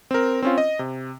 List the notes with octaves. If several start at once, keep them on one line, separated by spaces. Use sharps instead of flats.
C4 A#4
C4 C#4 F4
D#5
C3